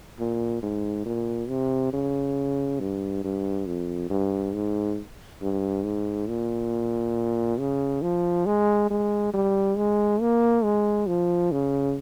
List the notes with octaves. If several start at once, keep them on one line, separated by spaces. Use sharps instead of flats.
A#2
G#2
A#2
C3
C#3
G2
G2
F2
G2
G#2
G2
G#2
A#2
C#3
F3
G#3
G#3
G3
G#3
A#3
G#3
F3
C#3